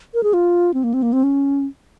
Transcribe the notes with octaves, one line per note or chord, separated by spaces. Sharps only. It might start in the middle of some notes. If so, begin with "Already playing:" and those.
A#4
G#4
F4
C4
A#3
C4
A#3
C4
C#4